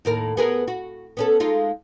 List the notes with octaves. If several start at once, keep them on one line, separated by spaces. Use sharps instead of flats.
D#2 A2 A#4
B3 G#4 A#4
F#4
B3 C#4 A4
G#3 D#4 F4